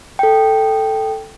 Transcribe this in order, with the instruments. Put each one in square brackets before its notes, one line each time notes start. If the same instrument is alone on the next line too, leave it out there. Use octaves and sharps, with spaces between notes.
[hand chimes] A4 G5